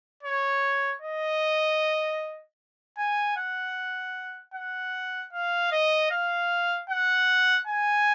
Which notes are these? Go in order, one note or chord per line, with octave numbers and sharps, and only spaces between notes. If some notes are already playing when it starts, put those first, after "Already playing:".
C#5
D#5
G#5
F#5
F#5
F5
D#5
F5
F#5
G#5